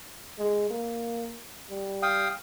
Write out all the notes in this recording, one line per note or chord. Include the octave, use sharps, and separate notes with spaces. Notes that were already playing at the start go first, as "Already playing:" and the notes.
G#3
A#3
G3
F5 G5 D#6